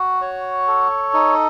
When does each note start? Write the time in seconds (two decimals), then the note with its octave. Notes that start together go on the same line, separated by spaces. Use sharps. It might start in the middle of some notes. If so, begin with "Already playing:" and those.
Already playing: F#4
0.21 C#5
0.67 A4
1.13 D#4